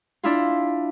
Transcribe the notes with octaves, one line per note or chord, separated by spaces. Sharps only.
D4 E4 F4